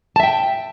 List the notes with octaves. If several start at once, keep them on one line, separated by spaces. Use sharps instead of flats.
E5 G5 A5